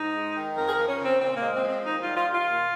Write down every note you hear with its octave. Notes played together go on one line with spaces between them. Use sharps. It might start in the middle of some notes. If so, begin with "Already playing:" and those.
Already playing: G#2 D#4
G#3
D#3
F2 A#4
G#4
A#4
F3
C#4
C#3 C4
A#2 C4
A#3
G#3
C4
F3
C4
D#2 D#4
G3 F4
F4
D#3
F4
A#2